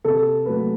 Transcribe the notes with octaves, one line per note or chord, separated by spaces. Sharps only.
C3 A4
F#3 A3 B4